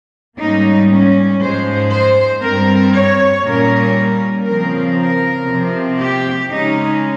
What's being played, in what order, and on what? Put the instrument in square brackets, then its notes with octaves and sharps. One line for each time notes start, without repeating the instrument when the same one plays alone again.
[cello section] G#2 G3 A#3 C#4 D#4
C#4
G#2 F3 G#3 C5
C5
G2 G3 C4 A#4
C#5
A#2 G3 A#3 C#4 A#4
C#3 F3 C4 A#4
A#4
C3 F3 C4
G4
C#3 G#3 C#4 D#4